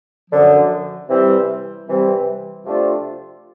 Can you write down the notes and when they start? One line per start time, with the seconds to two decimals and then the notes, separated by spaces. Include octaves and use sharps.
0.30 F#2 D3 F3
1.09 C3 E3 G3 C4
1.87 C3 E3 G3 C4
2.65 C3 F3 A3 D4 F4